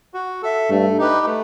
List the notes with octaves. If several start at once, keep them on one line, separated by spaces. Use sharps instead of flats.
F#4
A4 E5
G2 A3
D#4 G4 B4
A3